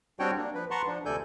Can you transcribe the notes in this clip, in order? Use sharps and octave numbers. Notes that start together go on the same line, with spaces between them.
G3 C4 D4 F#4 C#5 G5
A#3 D4
F3 B4
B4 F#5 A5 A#5 C6 C#6
F3 D4
D2 C3 A4 D5 G#5 G6